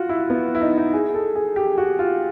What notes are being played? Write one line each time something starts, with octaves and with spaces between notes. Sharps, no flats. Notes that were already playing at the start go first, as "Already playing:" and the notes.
Already playing: F4 F#4
E4
B3
E4
D#4
D#4
G#4
A4
G#4
G4
F#4
F4